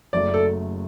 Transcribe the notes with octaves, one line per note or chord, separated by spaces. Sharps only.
F#1 F#2 F#3 A3 D5
A4